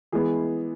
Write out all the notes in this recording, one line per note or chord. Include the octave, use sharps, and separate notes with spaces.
E3 G#3 B3 G#4